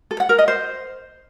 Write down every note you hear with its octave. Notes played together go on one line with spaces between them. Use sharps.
A4
F#5
A#4
D#5
C5